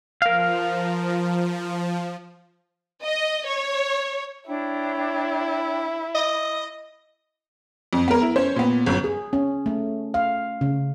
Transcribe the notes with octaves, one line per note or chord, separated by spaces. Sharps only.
F3 A#4 F5
D#5
C#5
D4 E4 C#5 G5
D#5
F2
B3 A#4
E4
C#4 C5 C#5
A#2 B3
G1 F#2
G#4
C#4
A3
F5
C#3